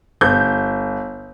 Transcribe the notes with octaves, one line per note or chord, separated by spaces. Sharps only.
G1 G6